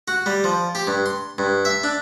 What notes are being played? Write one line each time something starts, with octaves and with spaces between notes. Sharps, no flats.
F#4
G3
F3
G4
G2
C6
G2
E5
D4